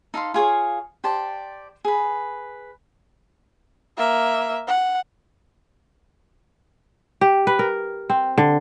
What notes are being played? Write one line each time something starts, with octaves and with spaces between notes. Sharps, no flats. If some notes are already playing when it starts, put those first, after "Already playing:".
D#4 A4 F5 C6
F4 G#4 C#5 F5
G4 C5 D5 A5
G#4 B4
A#3 E5
F#5
G4
B4
A#4
C4
D3